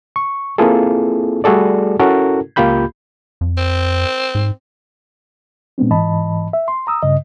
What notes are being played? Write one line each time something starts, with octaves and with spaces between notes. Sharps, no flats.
C#6
A#3 C4 E4 F4 G#4 A4
G3 A3 F#4 G#4 A4 D5
C#4 E4 F#4 A4 A#4
C#2 A#3 F4 G4 B5 G6
F2
C4
G#2
A#2 G#3 B3 C4 D4
G#2 E3 D#5 A5 B5
E5
C6
A#5 D#6 E6
G2 C#3 D#5